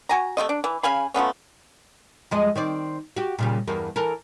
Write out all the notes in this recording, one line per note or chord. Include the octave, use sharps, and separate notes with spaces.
F#4 G#5 A#5
C3 A3 F4 D#5
D4
E3
C#3 F5 G#5 B5
F3 A3 B3 C#4
F2 G#3 D#5
D#3 C4 D5
F#4 G4
A#2 C#3 G3
E2 G2 A#3
E3 A4 A#4